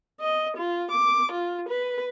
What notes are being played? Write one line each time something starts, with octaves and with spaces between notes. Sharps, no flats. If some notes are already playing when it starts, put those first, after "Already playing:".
D#5
F4
D6
F4
B4